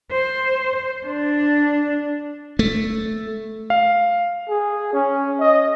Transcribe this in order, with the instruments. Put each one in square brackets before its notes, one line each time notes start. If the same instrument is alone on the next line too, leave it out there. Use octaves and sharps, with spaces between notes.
[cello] C5
D4
[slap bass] A3
[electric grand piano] F5
[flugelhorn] G#4
C#4
D#5